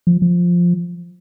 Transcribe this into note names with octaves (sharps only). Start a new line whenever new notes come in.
F3
F3